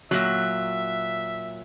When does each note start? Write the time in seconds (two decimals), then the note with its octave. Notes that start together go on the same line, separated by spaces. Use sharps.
0.11 A#2 F#3 E5